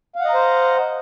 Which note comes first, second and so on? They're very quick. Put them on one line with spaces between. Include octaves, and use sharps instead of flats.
F5 F#5 D#5 A#5 C5